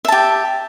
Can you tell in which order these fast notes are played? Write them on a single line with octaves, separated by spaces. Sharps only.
E5 A5 G4